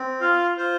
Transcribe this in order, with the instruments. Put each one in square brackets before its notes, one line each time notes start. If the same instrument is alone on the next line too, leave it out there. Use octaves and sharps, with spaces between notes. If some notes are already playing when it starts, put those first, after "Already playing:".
Already playing: [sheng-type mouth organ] C4
F4 F5
F4 C5